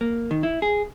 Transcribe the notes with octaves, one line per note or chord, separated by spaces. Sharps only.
A#3
D#3
E4
G#4